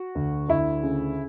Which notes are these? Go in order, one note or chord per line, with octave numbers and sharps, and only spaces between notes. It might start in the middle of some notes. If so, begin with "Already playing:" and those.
Already playing: F#4
D2
D2 E4
C#3